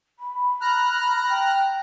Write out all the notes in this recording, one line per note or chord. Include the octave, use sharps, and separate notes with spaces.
B5
A#5 F6 F#6
G5